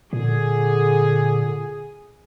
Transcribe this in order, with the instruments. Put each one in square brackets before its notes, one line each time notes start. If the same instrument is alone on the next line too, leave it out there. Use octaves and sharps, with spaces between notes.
[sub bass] A#2 [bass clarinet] D3 [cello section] G#4